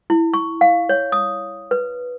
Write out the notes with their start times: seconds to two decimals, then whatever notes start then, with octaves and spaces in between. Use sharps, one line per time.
0.10 E4
0.34 C#6
0.61 F5
0.89 C#5
1.12 D#6
1.71 B4